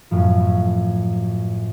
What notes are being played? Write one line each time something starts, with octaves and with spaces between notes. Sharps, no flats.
F#2 A2 F3